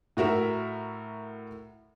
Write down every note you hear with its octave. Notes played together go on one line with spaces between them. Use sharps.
A2 F#4 A#4 E5